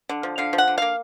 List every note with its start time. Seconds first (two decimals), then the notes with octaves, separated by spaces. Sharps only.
0.09 D3
0.23 F3
0.38 D3 F5
0.53 F3
0.58 F#5
0.68 D3
0.78 A#3 F5